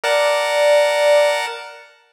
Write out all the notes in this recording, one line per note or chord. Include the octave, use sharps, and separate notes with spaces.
A#4 D5 F#5 A5